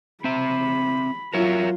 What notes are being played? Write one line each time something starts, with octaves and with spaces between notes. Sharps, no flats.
C4 E5 B5
F#3 F4 A#4 C#5 E5